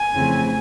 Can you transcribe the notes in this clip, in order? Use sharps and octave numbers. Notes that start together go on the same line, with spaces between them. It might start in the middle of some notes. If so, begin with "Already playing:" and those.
Already playing: G#5
F2 C#3 E3 A3 C4